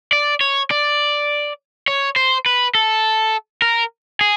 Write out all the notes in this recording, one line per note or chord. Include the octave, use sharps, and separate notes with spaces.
D5
C#5
D5
C#5
C5
B4
A4
A#4
G#4